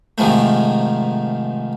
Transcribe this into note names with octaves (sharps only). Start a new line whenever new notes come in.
G#2 C3 D#3 F3 G#3 A3